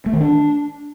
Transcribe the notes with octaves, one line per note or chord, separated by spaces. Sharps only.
A3
D#3
D4